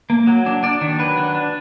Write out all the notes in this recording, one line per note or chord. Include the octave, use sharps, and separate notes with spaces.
A#3
F#3
D4
D4 D5
D#3
F#3 B4
D4
D4